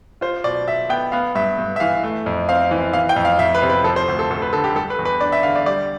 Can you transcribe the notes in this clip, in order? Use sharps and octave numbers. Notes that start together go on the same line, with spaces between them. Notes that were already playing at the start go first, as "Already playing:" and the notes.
F4 C5
B2 D5
B2 E5
B3 G5
B3 F5
G2 E5
G2
E5
E3 F5
A3
F2
C4 F5
E3
E3 F5
G5
F2
F5
F2 E5
B4
C3
B4
F3 A4
C5
D2
A4
D2 A4
B4
D3 A4
G4
G3 A4
B4
E2
B4
D4 D5
E5
D3 F5
D5
G3 D5